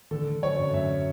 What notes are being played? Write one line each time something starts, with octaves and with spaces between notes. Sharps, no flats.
D3 A4
D3
F#3 C#5
F#2
F#2 E5